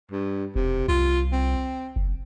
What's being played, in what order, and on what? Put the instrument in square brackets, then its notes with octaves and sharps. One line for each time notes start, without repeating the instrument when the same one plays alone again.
[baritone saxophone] G2
[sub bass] E1 [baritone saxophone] C3
[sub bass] C2 [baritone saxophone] F4
[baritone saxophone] C4
[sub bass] F#1